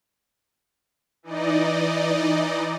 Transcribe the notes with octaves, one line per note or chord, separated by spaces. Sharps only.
E3 D#4 D5 D#5